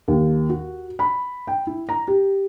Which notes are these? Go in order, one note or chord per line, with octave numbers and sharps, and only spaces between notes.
D#2
F#4
B5
G5
E4
A#5
G4